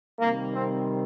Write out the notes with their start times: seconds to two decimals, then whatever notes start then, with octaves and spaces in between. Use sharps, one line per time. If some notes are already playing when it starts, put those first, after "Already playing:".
0.20 C3 D#3 G3 A#3
0.54 C4